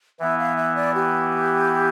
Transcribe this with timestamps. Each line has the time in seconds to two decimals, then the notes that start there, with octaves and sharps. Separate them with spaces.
0.20 E3 B3 E4 E5
0.38 F5
0.56 E5
0.75 D5
0.95 G4